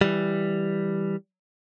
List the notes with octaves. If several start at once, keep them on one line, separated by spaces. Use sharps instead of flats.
E3 G3